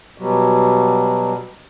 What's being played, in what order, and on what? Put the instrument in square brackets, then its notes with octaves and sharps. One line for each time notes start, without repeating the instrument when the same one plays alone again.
[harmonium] B2 F#3 G3